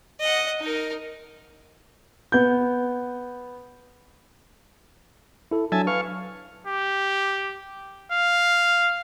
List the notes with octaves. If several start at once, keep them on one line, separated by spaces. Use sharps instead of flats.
D#5 F#5
D#4 A#4
B3 G6
E4 A4
F#3 D4 E5 G#5 A5
B4 F5 C#6
G4
F5